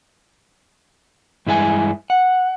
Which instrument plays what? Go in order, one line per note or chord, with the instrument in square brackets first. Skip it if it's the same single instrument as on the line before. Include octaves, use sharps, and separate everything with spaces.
[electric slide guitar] G2 E3 G#3 E4 G#4 G#5
F#5